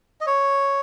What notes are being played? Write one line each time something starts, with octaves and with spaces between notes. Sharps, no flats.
D#5
C#5